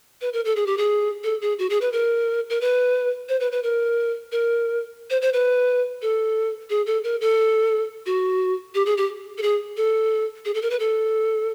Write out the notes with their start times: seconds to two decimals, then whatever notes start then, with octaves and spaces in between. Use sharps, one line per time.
0.21 B4
0.33 A#4
0.45 A4
0.56 G#4
0.67 G4
0.78 G#4
1.24 A4
1.42 G#4
1.59 F#4
1.70 G#4
1.81 B4
1.92 A#4
2.50 A#4
2.61 B4
3.29 C5
3.40 B4
3.52 B4
3.63 A#4
4.32 A#4
5.10 C5
5.22 C5
5.33 B4
6.02 A4
6.70 G#4
6.87 A4
7.04 A#4
7.21 A4
8.06 F#4
8.75 G4
8.86 G#4
8.97 G4
9.38 A4
9.42 G#4
9.77 A4
10.45 G#4
10.54 A4
10.62 A#4
10.71 B4
10.80 A4